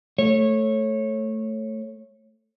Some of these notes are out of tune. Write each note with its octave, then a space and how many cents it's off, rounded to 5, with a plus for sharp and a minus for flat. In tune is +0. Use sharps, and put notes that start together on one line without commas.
A3 +0 C#5 -15